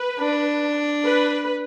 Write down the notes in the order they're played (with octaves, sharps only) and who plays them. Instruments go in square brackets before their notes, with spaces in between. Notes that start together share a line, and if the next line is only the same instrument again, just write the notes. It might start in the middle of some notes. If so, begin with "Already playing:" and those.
Already playing: [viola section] B4
[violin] D4
[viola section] B4